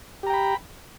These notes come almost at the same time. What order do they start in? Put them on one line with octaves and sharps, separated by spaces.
G4 A#5 G5 B5